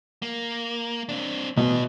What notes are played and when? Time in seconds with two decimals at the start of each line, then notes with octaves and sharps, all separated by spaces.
0.22 A#3
1.09 C4 D4
1.57 B2 B3 E4